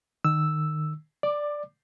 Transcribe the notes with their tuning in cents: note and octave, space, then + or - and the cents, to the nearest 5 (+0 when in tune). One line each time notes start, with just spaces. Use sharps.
D#3 -25 E6 +0
D5 +0 D6 +20